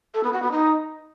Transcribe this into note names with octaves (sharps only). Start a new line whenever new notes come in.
A4
B3
F#4
B3
D#4